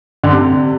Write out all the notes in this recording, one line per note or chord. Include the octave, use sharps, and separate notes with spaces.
D3
C3